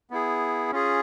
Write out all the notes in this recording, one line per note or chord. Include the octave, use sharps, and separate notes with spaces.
B3 E4 G#4
C#4 F4 G#4